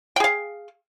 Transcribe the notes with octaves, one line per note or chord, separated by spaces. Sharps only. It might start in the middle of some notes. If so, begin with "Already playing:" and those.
G#4 F5 G5